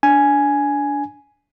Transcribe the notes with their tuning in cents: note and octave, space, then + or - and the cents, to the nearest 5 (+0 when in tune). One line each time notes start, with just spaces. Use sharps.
D4 -15 G#5 +5